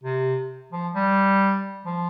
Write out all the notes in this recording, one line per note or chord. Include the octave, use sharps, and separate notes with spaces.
C3
F3
G3
F3